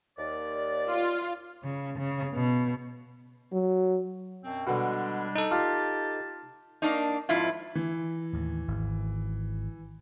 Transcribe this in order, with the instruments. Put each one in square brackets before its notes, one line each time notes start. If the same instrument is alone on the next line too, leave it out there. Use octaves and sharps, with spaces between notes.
[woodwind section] D#2 D5
[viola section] F4
[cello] C#3
C#3
B2
[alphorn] F#3
[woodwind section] F#2 B2 C4
[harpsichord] B2 D3 [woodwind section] G3 G#3 D4
[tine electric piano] D#4 A4
[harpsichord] F4 D5 [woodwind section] G4 A5
[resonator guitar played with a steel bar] A#3 D4 D#4
F2 G#2 E4 F4
[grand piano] E3
[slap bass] D#2 A2
G#1